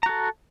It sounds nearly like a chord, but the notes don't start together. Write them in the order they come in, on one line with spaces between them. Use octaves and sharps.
A#5 F#4 A4